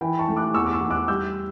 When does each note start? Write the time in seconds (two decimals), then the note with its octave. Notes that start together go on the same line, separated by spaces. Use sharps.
0.01 E3 G5 B5
0.19 A5 C#6
0.28 A3
0.37 D6 F#6
0.54 E2 C#6 E6
0.66 D6
0.73 C#6 E6
0.81 E2
0.90 D6 F#6
1.08 G3 E6 G6